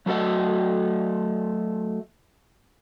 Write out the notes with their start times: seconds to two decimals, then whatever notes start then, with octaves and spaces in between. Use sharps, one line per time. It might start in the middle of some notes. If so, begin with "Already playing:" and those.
0.06 F#3 A3 F#4 G4 A4 D#5